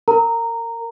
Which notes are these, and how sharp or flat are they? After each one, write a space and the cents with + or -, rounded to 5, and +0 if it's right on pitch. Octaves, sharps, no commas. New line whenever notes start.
A#4 -25 A#5 -10